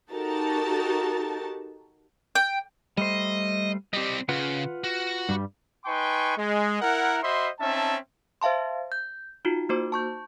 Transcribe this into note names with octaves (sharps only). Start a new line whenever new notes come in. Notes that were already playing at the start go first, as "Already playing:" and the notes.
D#4 F#4 G4 A4 A#4 A5
G5
G3 A3 C5 D#5
G3 C4 G4 D#5
C#3 F4 B4 F#5
F#4
G2 G3
D#4 B4 G5 G#5 C6 C#6
G#3
E4 A#4 F#5
F#4 C5 D#5 E5 B5 C6
C4 C#4 D#4 E5 A5
C5 E5 F5 A5 C6
G6
D#4 F4 F#4
A#3 D#4 F#4 C5 D6
A5 C#6 G6